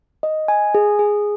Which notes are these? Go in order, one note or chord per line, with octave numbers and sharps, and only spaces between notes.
D#5
G#5
G#4
G#4